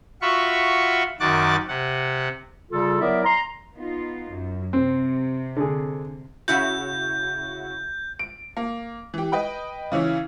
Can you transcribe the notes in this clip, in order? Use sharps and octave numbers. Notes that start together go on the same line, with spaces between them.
F4 F#4 E5 B5 C#6
F#2 D#3 F#4 D6 F#6 A6
C3 F#5
C#3 G3 F4 A4
F#3 B3 E4 A#4 D5 E5
A#5 C6
B3 D#4 F4
F#2
C3 C4
D3 G#4
C#3 E4 F#4 G6
D7
A#3
E3 G4
B4 D#5 G5 B5
C#3 E3 C#4 E4